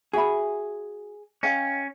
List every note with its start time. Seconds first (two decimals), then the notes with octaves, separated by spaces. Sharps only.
0.13 F#4 G#4 E5 B5
1.43 C#4 D#5 F5 G5